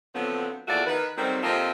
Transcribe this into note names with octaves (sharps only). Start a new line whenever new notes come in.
D3 F3 F#3 A3 B3 C4
E2 F3 A3 A#3 F#4 D5
D#3 B4
D#3 F#3 G3 A3 C4
C3 F3 A#3 C4 A4 D#5